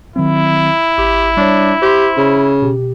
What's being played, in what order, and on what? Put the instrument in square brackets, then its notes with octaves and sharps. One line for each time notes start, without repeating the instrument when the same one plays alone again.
[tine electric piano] D#3 F#3 C4 [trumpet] E4
[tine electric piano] G#1 [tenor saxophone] G4
[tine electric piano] G3 C#5 [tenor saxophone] D4
[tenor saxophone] G4 [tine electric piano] C5 C6
[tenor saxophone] C#3
[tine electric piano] B2 G4